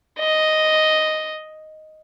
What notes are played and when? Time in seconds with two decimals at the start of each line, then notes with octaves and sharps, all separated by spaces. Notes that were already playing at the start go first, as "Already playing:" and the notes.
0.19 D#5